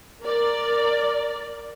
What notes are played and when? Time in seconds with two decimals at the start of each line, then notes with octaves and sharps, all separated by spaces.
0.23 A#4 D5